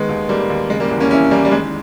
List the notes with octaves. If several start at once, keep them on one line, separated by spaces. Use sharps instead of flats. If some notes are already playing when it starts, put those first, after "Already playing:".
Already playing: D#3 G#3 B3
D#2
D#2 G3 A#3
D#2
C#3 G#3
G3 A#3
E2
A#3 C#4
E3 C#4 E4
E2 G3 A#3
G3
D#3 G#3